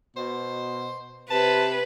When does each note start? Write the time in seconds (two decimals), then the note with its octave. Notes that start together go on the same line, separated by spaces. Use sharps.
0.16 B2 C5
1.30 C3 B4 A5